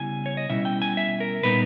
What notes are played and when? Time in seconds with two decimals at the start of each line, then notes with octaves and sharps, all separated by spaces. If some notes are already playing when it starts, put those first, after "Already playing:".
Already playing: C#3 G3 B3 E4 G#5
0.26 C#5
0.37 D#5
0.50 B2 G3 C#4 E4 E5
0.65 G5
0.82 G#5
0.97 E5
1.20 A#4
1.43 A#2 G3 B3 D#4 B4